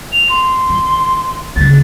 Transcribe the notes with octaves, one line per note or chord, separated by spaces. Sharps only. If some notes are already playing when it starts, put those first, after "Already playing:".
F7
C6
D#3
D2 C#3 A6